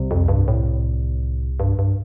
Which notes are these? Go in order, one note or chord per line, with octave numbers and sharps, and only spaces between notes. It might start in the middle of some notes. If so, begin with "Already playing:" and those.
Already playing: C2 C3 G3 C4
F2
G2
A2
G2
G2